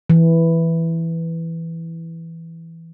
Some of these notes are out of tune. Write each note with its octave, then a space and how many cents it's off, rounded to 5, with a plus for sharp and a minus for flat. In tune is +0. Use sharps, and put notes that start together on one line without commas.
E3 +0